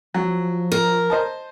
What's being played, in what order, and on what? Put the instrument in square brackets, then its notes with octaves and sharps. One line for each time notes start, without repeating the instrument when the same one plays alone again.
[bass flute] F3 [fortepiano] F#3
[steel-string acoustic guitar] A#4
[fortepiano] C5 D#5 A5